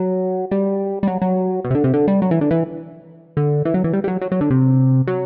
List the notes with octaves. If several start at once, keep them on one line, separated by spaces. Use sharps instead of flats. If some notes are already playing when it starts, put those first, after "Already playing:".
Already playing: F#3
G3
G3
F#3
F#3
B2
C3
D3
C3
D3
G3
F#3
E3
D3
E3
D3
E3
F#3
E3
G3
G3
F#3
F#3
F#3
D3
C3
F#3